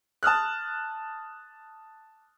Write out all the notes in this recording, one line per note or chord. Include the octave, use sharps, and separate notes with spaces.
A5 D#6 F6 F#6